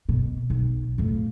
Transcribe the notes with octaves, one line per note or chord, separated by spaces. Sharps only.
B2
B1
F2 A2